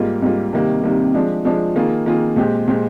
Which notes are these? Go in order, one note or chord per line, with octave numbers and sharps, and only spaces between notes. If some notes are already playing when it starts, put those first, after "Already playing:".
Already playing: G#2 G3 A#3 F4
G#2 G3 A#3 F4
C3 D#3 G3 A#3
C3 D#3 G3 A#3
F3 G#3 D4
F3 G#3 D4
D#3 A#3 F4 G#4
D#3 A#3 F4 G#4
A#2 G#3 C4 G4
A#2 G#3 C4 G4